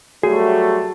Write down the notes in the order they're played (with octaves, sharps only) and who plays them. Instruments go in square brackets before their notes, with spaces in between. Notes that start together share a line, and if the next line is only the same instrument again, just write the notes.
[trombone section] F#3 G3 A3 [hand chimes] F#4 [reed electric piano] G#4